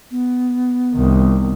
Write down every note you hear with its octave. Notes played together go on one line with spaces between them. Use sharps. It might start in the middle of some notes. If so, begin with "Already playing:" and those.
B3
C2 D#3